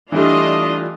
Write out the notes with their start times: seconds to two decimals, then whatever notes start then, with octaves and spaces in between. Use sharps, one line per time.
0.12 E3 G3 A3 D4 F4 D#5